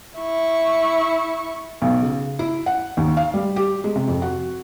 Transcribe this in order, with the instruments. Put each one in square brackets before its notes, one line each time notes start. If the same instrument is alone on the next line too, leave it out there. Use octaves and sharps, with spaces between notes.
[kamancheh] E4 C#6
[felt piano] B1
C#3
E4
F#5
D#2
F5
G3
G4
G#3
C3
F2
F#4